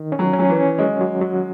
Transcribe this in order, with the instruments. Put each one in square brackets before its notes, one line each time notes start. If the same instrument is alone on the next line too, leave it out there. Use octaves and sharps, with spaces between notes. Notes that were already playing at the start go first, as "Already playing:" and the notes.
Already playing: [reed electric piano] D#3
C#4
[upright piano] F#3
[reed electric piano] C#4
[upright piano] F#3
E3
[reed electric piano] C#4
[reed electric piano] F#3 [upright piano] G#3
[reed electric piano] F#3
F#3